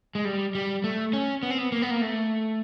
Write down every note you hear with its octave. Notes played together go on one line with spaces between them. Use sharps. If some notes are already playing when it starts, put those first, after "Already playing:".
G#3
G3
G3
A3
C#4
B3
C4
B3
A#3
B3
A#3
A3